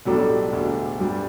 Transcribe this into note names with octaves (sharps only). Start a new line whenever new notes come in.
B1 A2 G3 D4 A4
E1 D2 D3
G2 G3 D4